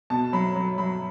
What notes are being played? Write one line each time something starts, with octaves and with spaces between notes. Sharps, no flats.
B2 A5
F#3 B5
F#3
F#3 B5